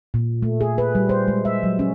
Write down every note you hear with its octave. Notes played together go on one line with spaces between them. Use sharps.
A#2
A3
G#4
B4
G3
C5
G#3
E5
F#3
C#4